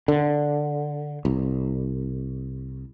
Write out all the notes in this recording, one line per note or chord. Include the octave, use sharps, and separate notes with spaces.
D3
C2